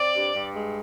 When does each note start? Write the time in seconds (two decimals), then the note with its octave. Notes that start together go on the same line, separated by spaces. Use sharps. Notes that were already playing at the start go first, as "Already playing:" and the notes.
Already playing: C4 D5
0.14 G2
0.35 G2
0.55 G#3